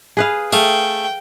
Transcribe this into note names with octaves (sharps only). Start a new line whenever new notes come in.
G#4 B4 F5
A3 G#4 F5 G5